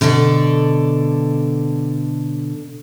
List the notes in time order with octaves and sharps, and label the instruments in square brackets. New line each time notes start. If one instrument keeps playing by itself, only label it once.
[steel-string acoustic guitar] B2 D3 A4 A#4 D5